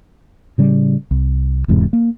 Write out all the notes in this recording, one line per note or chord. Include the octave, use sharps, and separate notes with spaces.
A2 C#3 G3
C2
E1 E2 G#2 C3
A#3